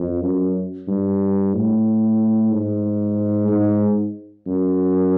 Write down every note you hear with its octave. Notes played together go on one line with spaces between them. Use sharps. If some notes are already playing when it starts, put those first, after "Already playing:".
Already playing: F2
F#2
G2
A2
G#2
G#2
F#2